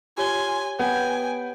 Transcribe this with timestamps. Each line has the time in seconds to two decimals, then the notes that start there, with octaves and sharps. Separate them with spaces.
0.18 F4 G4 C#5 G#5 G7
0.79 B3 G5 G#5